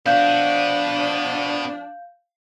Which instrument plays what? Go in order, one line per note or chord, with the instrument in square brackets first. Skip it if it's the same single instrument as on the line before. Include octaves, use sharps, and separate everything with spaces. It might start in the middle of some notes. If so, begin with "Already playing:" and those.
[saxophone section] F3 D4 [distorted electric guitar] B3 F#4 [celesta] F5 G6